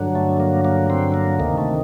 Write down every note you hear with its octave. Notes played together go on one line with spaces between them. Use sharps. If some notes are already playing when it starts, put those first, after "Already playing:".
Already playing: G2 D3 F#3
A3
A#3
A#3
C4
A#3
D2 C3 D#3 A#3
A3